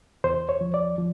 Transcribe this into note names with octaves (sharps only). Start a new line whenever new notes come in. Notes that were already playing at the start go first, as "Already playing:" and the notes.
E2 C5
C#5
F3
D5
F3